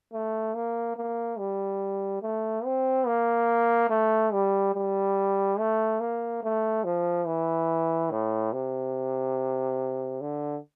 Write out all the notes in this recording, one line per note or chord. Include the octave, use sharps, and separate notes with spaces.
A3
A#3
A#3
G3
A3
C4
A#3
A3
G3
G3
A3
A#3
A3
F3
E3
A2
C3
D3